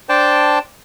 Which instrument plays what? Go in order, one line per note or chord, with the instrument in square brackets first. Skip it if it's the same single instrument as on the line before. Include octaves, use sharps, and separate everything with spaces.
[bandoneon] D4 C5 D5 G5 A5